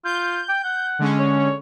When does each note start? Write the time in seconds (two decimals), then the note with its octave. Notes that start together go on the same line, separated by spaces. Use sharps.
0.04 F4 G6
0.49 G5
0.64 F#5
0.99 D3 G#3 C#4
1.19 C#5